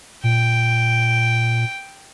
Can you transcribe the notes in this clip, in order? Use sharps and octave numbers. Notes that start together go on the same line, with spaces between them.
A#2 G5